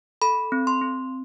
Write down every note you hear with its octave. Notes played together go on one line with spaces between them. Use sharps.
A4 B5
C4
C6
C4